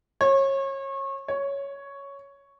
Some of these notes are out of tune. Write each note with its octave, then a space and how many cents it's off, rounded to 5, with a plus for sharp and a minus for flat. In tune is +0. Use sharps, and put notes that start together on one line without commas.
C#5 -30
C#5 +5